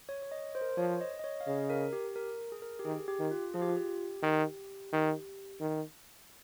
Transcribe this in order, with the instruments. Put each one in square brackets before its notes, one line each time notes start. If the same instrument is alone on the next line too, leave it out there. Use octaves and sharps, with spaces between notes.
[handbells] C#5
C#5
D#5
C5
A#4
C5
[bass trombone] F3 [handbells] C#5
[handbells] D#5
D#5
C#5
F5
[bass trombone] C#3 [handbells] D#5
[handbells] A#4
G4
A#4
G#4
A#4
G4
[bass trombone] D#3 [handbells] G#4
[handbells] G4
[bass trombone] D#3
[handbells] F4
[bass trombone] F3 [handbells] G#4
[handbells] G4
F4
G4
[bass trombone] D#3
D#3
D#3